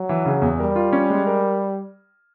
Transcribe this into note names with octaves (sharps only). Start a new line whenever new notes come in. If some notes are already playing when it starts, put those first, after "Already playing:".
Already playing: F#3
E3
C#3
E2
G3 A#4
F4
C#4
G#3
A#4